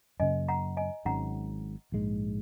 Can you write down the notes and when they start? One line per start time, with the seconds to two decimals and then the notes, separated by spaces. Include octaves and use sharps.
0.20 F#2 C#3 A#3 D#5 G#5
0.48 F#5 A#5
0.77 D#5 G#5
1.05 G#1 G#2 F#3 C#4 F#5 A#5
1.92 A#1 G#2 G#3